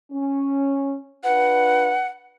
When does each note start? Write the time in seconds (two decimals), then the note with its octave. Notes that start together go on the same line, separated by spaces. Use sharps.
0.11 C#4
1.24 D4 F4 B4 F#5